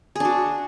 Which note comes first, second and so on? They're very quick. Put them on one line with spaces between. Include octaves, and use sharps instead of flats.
G#4 D4 F#4